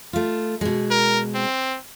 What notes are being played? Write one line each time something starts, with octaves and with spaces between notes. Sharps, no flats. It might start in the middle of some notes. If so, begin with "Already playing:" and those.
A3 F4
B2 G#3
A#4
C4